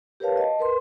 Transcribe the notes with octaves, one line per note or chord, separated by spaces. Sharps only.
G4 A#4 B4 C#5 F5 A5
D#5 A5
A#4 B4 C6